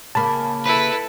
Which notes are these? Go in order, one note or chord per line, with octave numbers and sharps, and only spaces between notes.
C#3 A#3 A5 B5
E4 A4 B4